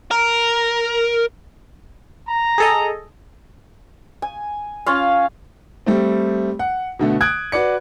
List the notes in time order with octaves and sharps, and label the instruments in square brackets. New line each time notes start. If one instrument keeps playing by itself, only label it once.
[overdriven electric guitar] A#4
[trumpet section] A#5
[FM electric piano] G#4 A4 D#5
[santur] G#5
C#4 F4 F5
[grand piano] G3 A3 C4
F#5
B2 D3 A3
D#6 F#6 G#6 D7
F#4 B4 D5 C#7